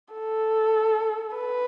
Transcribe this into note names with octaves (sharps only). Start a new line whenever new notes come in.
A4
B4